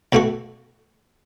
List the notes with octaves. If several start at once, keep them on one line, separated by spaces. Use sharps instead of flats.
B1 B2 A3 F#4